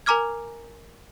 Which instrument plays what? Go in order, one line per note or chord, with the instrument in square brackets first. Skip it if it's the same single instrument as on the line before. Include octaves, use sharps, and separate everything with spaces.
[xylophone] A#4 G#5 A#5 D6 F6 G#6